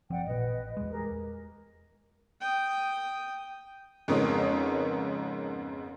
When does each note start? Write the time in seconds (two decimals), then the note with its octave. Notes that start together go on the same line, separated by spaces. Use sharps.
0.10 F#1 F3 C4 D5 F#5 G5
0.26 A1 A#2 B4 D#5
0.77 E2 G#3
0.90 G4 G#4 A#4
2.41 G5 D#6
4.08 F2 G#2 C#3 B3 A#4 C#5